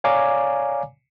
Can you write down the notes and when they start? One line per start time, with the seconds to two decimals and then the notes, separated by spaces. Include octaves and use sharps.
0.04 C#5 D5 F5 G#5 A#5 D6